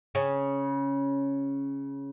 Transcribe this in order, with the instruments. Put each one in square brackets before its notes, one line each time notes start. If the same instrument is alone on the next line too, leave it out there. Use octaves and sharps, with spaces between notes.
[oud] C#3 C#4